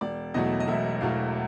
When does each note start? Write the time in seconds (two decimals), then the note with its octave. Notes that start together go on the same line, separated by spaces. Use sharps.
0.01 E1 D5
0.34 E2 B2 F#3 A3 D#5
0.60 D#5
0.68 E1 E5
1.01 E2 B2 F#3 A3 F5